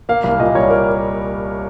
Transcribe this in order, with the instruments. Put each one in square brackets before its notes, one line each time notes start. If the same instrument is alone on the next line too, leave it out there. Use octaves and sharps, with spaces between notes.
[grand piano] A#3 F5
C2 F5
A#2 D#5
G3 C#5
A#4